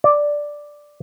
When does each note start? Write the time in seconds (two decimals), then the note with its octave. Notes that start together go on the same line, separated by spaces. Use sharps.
0.04 D5